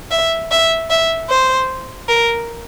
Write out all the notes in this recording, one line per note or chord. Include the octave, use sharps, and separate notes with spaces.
E5
E5
E5
C5
A#4